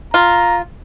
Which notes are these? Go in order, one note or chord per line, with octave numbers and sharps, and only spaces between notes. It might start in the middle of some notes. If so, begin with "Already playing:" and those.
F4 A#5